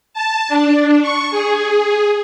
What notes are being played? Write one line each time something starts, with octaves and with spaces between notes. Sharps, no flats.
A5
D4
C#6
G#4